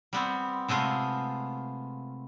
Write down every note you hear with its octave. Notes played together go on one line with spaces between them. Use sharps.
G3 B3 C4
C3 G#3 A3 B3 F4